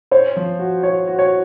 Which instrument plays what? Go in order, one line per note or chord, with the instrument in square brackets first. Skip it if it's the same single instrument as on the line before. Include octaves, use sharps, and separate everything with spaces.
[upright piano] C5 [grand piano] C#5
[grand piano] F3
F#4
[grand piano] F#4 [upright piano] C#5
[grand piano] F#4
[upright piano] C#5